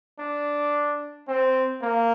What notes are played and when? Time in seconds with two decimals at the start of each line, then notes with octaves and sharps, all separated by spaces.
0.19 D4
1.28 C4
1.82 A#3